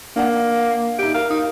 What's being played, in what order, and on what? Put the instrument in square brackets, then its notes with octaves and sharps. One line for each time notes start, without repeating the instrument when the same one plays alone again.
[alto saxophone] A#3 [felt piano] D4 F#5
[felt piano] D#4 E5 [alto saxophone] G4
[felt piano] A#4 [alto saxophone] F5
[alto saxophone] D#4